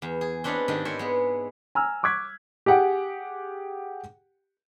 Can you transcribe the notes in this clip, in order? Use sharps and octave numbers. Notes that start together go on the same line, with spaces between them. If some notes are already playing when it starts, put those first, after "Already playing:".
E2
G#4
C4 D4 B4 C#5 D#5 F5
G#2 D#3 D4 G4 D#5
E4 A#4 C5 C#5 G#5
G#3 B3
G#5 A#5 E6 F6
C#6 D6 F#6 G#6 B6
G4 G#4 F#5 G5